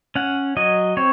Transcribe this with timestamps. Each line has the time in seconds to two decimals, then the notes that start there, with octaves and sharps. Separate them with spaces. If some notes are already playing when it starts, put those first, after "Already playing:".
0.15 C#4 F#5
0.57 F#3 D#5
0.97 C4 C#5